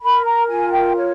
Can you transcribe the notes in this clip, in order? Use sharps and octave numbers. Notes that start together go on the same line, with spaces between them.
A#4 B5
A#5
F4 G#5
G5
C#5